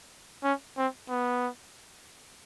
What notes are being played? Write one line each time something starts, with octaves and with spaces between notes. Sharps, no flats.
C#4
C4
B3